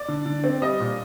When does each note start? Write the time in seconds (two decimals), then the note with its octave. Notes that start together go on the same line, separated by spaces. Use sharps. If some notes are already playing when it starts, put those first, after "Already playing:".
Already playing: D5
0.08 D3
0.26 D3
0.44 C4
0.62 G3 D#5
0.80 A#2